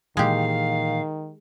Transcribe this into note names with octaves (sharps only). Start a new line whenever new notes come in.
A#2 D#3 E3 G#3 G4 F5